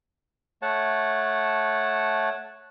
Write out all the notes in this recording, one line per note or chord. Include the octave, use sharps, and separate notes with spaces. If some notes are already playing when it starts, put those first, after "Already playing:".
A3 C#5 F#5 A5